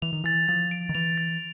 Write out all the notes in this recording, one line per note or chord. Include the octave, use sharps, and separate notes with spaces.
E3 F7
D#3
E3 A6
F3 A6
D7
D#3
E3 F7
A6